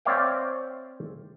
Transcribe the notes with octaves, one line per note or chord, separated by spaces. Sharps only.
C4 C#5 D5 E5 F5 G5